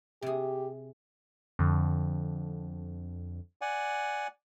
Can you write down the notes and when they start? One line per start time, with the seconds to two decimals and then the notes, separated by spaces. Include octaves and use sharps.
0.22 C3 G4 G#4
1.59 F2 D3
3.61 D5 F#5 G#5